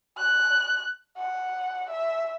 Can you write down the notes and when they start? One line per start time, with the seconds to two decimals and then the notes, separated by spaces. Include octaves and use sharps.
0.18 F#6
1.17 F#5
1.90 E5